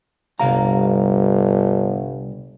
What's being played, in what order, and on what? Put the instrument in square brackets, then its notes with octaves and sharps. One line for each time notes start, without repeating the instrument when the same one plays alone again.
[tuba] G1 [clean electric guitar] C2 F5 A#5